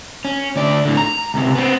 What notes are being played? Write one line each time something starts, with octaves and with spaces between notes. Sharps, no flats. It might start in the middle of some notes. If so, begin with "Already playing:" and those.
C#4
D2 D5
A2 D3
A#5
C#2 C3
B3 C4